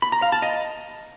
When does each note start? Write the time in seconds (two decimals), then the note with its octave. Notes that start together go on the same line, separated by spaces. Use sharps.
0.02 B5
0.12 A#5
0.22 F5
0.32 A5
0.42 D#5